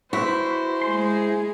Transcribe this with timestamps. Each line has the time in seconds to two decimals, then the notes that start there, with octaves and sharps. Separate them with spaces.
0.13 E4 F#4 B4 C5 E5
0.82 G#3 G#4 C6